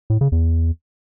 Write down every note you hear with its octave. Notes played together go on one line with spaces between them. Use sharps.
A2
C#3
E2